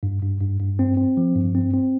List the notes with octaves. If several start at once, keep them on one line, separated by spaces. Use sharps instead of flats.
G2
G2
G2
G2
C4
C4
F3
G2
C4
C4